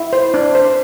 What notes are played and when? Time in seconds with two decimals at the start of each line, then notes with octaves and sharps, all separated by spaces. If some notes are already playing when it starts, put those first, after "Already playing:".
Already playing: E4
0.13 C5
0.34 D4
0.55 C5